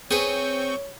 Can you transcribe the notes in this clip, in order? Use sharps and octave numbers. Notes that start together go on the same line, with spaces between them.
C4 G#4 B4 C#5 C#6 G6